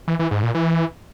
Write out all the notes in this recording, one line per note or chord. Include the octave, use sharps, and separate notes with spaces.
E3
E3
G#2
A#2
E3